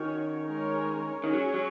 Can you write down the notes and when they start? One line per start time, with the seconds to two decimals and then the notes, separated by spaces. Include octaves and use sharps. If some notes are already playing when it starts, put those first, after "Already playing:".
Already playing: D#3 C#4 F#4 C#5
0.45 G#3 C#4 A#4 C#5
1.23 D#3 C#4 G#4 C#5
1.33 F#3
1.54 F#3